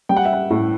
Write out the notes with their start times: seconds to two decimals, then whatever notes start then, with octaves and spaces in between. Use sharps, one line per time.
0.09 G3 G5
0.16 F#5
0.25 E5
0.33 F#5
0.51 A2